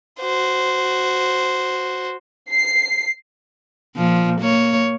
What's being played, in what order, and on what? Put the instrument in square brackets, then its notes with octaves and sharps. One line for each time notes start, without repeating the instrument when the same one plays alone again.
[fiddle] F#4 C5
[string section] C7
[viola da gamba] A#2 F3
A#3 C#5